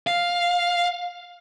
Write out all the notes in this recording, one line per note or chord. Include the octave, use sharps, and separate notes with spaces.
F5